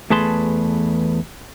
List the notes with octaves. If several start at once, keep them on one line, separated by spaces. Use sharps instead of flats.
E2 A3 G#4 B4 A5 C6